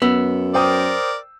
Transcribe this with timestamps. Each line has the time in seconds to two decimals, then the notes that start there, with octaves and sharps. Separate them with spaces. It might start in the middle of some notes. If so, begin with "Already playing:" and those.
0.02 F#2 B3 E6
0.54 A#4 C5 D5 G5 D#6